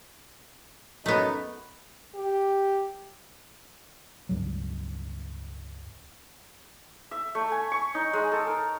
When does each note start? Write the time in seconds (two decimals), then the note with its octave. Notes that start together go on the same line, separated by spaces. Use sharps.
1.06 F#2 A3 B3 D#4
2.15 G4
4.29 C#2 G2 F#3
7.11 E5
7.35 A3
7.52 G#5
7.72 C#6
7.95 D#4
8.13 G#3
8.32 A4
8.47 A#4